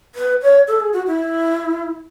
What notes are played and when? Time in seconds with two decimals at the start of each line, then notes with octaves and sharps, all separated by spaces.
0.15 B4
0.42 C#5
0.68 A4
0.80 G#4
0.93 F#4
1.07 E4